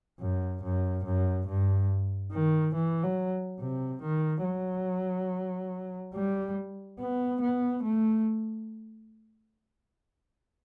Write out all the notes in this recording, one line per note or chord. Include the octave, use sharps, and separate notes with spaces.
F#2
F#2
F#2
G2
D#3
E3
F#3
C3
D#3
F#3
G3
B3
B3
A3